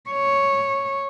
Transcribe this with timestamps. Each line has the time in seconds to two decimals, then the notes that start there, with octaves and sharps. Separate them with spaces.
0.10 C#5